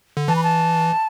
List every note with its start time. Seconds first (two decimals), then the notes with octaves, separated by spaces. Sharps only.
0.17 D3
0.28 E3 A5
0.36 B5
0.44 A5